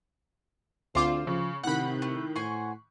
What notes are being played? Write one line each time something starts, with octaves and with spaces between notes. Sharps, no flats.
D2 D3 C4 F4 C5 D6
C#3 F3
A2 C3 D#3 F#5 B5 F#6
A3
A2 C5 F#5 G#5 C#6